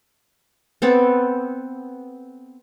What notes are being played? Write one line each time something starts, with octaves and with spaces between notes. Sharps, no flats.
B3 C4 A4